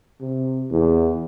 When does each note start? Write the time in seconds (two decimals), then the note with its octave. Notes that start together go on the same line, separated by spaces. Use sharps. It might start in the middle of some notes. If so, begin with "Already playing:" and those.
0.21 C3
0.71 E2